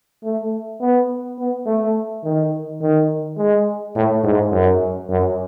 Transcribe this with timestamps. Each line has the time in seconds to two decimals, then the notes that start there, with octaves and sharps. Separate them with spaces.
0.23 A3
0.80 B3
1.38 B3
1.66 A3
2.24 D#3
2.81 D#3
3.37 G#3
3.95 A2
4.23 G#2
4.52 F#2
5.09 F#2